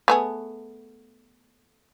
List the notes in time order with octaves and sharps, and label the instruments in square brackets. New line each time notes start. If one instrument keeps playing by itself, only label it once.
[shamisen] A3 B3 G#4